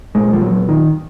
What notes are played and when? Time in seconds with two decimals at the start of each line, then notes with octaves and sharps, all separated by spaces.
0.15 A#2 G#3
0.33 F3
0.41 F#3
0.69 D#3